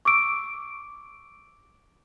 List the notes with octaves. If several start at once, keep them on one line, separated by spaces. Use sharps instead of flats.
C#6 D6 E6 D7